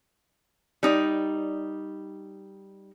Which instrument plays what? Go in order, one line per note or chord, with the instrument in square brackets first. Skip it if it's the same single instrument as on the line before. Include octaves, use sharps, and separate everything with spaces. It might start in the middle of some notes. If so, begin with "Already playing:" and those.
[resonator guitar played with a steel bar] G3 D#4 D5